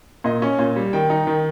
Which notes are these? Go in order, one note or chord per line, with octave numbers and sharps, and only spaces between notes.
A#2 D#5
C#4
A#2
G3
D#3 G5
D#4
D#3